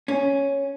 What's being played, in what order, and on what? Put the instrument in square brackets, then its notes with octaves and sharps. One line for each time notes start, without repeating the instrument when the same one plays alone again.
[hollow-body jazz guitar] C#4